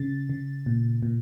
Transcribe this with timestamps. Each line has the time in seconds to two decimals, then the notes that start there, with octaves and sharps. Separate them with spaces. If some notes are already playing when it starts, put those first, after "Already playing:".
Already playing: C#3 A6
0.30 C#3
0.66 A#2
1.03 A#2